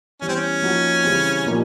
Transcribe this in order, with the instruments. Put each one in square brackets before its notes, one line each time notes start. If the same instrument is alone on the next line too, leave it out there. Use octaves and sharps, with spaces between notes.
[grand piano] E3 G3 B3 [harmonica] C#4
[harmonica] C4
C#4
[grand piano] F3 A#3 D#4 F#4
C#3 E3 G3 C4
A#2 F3 A#3 D#4 G4